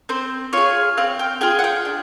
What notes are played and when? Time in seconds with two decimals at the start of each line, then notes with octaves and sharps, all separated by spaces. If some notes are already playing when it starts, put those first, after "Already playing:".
0.09 C4 C5
0.53 F4 G#4 C#5
0.97 C4 F5
1.19 G5
1.41 F4 G#4 G5
1.59 F#5
1.64 G5
1.85 D4